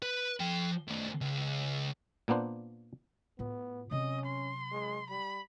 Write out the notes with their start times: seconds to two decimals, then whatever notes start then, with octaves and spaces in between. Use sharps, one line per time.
0.02 B4
0.40 F3 G5
0.88 D#3 A3
1.21 C#2
2.28 A#2 A#3 B3 D4 C5
3.39 A2 B3 F4
3.91 C3 F#3 C#4 D#5
4.26 C6
4.72 G#3
5.10 G3 B5